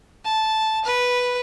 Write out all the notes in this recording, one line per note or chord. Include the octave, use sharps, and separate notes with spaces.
A5
B4